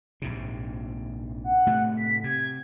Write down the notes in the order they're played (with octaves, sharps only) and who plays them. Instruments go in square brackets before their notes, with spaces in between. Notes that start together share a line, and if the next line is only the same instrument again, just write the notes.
[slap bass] A#1 G#2 C3
[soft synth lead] F#5
[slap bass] A2 C3 A3
[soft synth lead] B6
[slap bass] C3 [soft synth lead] G#6